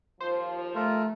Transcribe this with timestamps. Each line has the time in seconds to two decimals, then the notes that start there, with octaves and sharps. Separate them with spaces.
0.20 D#2 F3 C5
0.75 A3 F4 A#4